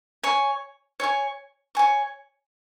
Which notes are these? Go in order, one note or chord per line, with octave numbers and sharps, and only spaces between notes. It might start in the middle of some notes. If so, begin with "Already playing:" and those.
C#5 G#5 C#6
C#5 G#5 C#6
C#5 G#5 C#6